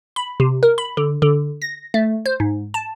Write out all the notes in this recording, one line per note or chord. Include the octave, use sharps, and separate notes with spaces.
B5
C3
A#4
B5
D3
D3
A#6
A3
C5
G#2
A5